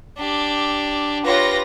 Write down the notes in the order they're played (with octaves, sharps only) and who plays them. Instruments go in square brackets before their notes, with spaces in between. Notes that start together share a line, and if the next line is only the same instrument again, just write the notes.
[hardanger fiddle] D4 G4
[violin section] F4 B4 A#6 [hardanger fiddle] G4 C#5